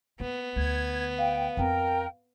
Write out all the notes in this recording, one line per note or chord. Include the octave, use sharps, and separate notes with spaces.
A#3 B3
D2 G#6
F5 G5
F2 C4 A#4 G5